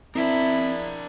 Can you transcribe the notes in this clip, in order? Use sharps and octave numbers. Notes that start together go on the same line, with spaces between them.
C4 D4 E4 A#4